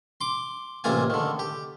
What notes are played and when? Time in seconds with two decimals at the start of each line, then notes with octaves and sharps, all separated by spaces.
0.21 C6 D6
0.84 A1 C3 A#3 F4 F5 G#5
1.10 D3 D#3
1.39 G4